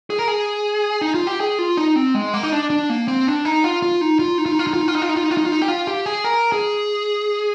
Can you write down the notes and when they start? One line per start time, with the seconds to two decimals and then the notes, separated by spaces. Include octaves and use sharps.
0.10 G#4
0.19 A#4
0.28 G#4
1.01 D#4
1.14 F4
1.27 G4
1.40 G#4
1.59 F4
1.77 D#4
1.96 C4
2.14 G#3
2.34 A#3
2.43 D#4
2.52 D4
2.70 D4
2.90 A#3
3.08 C4
3.27 D4
3.45 D#4
3.64 F4
3.82 F4
4.01 D#4
4.19 F4
4.38 D#4
4.46 F4
4.52 D#4
4.59 F4
4.67 D#4
4.74 F4
4.81 D#4
4.88 F4
4.95 D#4
5.02 F4
5.09 D#4
5.16 F4
5.24 D#4
5.31 F4
5.38 D#4
5.45 F4
5.52 D#4
5.62 G4
5.68 F4
5.87 G4
6.06 G#4
6.24 A#4
6.52 G#4